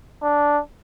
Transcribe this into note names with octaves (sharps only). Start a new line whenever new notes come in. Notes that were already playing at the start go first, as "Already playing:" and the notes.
D4